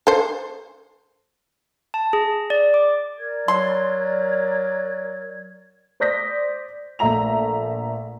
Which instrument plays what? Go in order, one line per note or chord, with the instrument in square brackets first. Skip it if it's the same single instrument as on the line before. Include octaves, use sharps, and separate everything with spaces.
[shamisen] A4 C5
[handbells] A5
G#4
D5
D6
[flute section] A#4 D5 G#6
[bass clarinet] F#3 [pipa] C6
[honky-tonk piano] C5 D5 D#6 G6 A#6 B6
A#1 A3 E5 A#5 F7